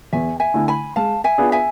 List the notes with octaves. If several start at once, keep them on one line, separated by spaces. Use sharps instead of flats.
E2 E5 G#5
E5 G#5
D3 A3 E4
G#5 B5
G#3 F5 A5
E5 G#5
B3 D4 F4 G#4
E5 G#5